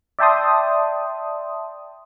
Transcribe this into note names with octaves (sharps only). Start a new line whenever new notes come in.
D5 E5 G5 A5 C6 D#6